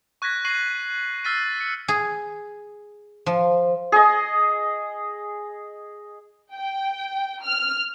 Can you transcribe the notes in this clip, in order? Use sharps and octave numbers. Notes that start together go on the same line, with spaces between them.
C#6 F#6 G#6 A#6 B6
C#6 A#6 C7 D#7 F#7
E6 F6 A6 B6 C7 D#7
C#7
G#4
F3
G#4 D#5
G5
F6